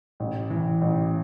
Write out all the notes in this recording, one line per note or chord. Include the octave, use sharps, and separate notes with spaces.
A1
E3
A1